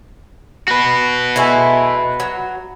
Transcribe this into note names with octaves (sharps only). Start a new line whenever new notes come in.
F#4 B4
G#3 A3 E4
F#3